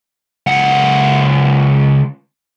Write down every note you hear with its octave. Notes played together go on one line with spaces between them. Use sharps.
C#2 F#5